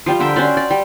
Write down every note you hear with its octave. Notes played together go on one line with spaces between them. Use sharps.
F3 G3 F4
D3 A#4 E5 G5
C#4 F#4 C5 D5
D5
G3